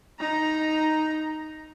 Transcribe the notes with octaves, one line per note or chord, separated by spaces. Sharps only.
D#4 A#5